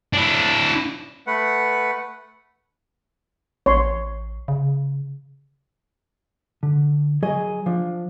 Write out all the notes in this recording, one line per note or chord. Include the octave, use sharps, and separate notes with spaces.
D4 E4
A3 B4 F#5
A1 C#5 C6
C#3
D3
F#3 G#4 D#5
F3 D4